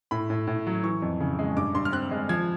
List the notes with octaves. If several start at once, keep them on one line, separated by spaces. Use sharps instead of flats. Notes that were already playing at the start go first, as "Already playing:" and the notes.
A2 B5
A2
A2
F#3
E3 C#6
F2
C#3
G#3
G2 D6
G2 C6
F6
C4 F#6
G#3
F3 G#6